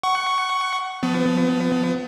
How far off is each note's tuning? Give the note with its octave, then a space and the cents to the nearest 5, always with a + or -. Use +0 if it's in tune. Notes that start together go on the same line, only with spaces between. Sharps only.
F#5 +20 C#6 +0
F3 +10 B3 +35